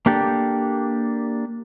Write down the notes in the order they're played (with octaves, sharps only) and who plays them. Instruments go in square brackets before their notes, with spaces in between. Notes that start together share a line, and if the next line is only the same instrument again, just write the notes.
[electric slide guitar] A#3 D4 G4 A4